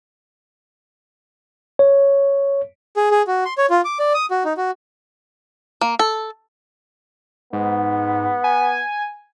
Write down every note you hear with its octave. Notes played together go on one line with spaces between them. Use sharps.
C#5
G#4
G#4
F#4
C6
C#5
F4
D6
D5
D#6
F#4
D#4
F#4
A#3
A4
G#2 B3
G#5